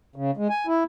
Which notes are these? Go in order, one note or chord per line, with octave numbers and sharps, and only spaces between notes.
C#3
G#3
G#5
E4